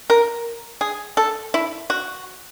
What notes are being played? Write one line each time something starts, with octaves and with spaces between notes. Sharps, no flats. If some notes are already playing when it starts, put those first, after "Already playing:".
A#4
G#4
A4
E4
F#4